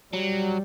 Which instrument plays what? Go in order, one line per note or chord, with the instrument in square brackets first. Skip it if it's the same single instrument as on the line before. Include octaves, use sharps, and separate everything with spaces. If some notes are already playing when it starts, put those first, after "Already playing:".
[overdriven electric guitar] F#3 [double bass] G3